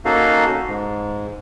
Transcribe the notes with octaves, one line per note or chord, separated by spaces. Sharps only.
A#3 C#4 D#4 F#4 A4 F5
G#2